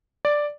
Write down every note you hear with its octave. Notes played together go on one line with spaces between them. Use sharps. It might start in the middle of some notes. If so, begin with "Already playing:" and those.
D5